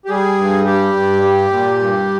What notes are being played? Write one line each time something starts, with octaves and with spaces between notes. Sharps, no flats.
G4
G3 G#4
G2
G3 G4
G2
G3
A#2
G2